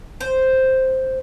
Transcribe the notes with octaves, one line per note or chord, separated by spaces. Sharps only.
C5